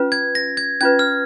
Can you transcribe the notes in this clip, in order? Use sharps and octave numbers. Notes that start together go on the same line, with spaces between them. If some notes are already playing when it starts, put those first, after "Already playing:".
Already playing: C#4 F4 B4
G#6
A#6
G#6
C#4 F4 B4 G#6
F6